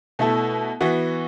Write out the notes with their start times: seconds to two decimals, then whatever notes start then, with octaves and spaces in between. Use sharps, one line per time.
0.19 B2 A3 E4 A4
0.81 E3 B3 F#4